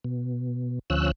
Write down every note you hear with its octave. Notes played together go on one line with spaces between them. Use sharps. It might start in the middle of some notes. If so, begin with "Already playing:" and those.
B2
D2 F3 C#4 E6 F#6